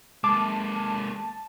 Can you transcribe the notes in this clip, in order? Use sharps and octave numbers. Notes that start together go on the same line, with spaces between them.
G#3 A#3 A5 D6